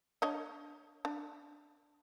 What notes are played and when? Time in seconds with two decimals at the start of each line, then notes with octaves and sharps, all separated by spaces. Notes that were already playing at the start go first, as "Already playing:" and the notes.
0.22 D4 C#5 D#5
1.05 D4